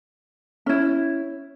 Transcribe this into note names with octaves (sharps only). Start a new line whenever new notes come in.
C#4 E4